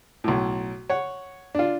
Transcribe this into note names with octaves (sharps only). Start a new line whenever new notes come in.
B1 A2
C#5 F#5
D4 F4